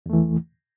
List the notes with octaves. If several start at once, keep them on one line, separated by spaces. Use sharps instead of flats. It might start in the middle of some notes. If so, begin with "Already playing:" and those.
E2 E3 A3